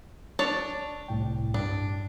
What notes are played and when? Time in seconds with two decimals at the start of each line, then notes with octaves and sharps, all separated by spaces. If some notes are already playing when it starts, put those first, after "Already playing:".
0.39 D4 C#5 A5
1.08 C2 A2 G5
1.54 G2 D4